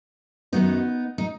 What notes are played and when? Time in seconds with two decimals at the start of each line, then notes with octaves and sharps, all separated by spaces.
0.53 F#2 D#3 F#3 B3 D#4
1.18 D#4